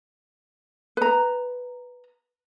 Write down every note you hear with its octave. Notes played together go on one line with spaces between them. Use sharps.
B4 A#5